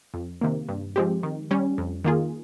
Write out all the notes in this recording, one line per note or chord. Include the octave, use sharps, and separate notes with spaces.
F2
C3 D#3 A#3
G2
F3 G#3 C4 G4
D#3
G3 C#4
F2
D#3 A#3 F4 G#4